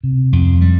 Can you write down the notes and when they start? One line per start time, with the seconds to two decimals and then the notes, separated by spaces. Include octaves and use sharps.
0.04 C3
0.33 F2
0.61 G3